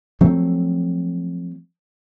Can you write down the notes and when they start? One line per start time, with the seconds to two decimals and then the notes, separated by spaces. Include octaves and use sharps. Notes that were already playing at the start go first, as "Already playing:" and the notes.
0.21 F3 F#3 A3 C4